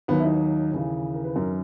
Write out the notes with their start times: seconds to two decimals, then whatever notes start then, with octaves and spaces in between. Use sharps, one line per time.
0.08 D#2 D#3 F#3 B3
0.19 E4
0.24 D#4
0.72 D#2 C#3 E3
1.14 A#4
1.24 B4
1.35 F#2 D#3 F#3 A#4